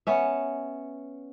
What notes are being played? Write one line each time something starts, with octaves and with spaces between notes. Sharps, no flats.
B3 C#4 E5